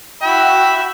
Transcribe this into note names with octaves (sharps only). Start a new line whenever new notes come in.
F#4 E5 G5 B5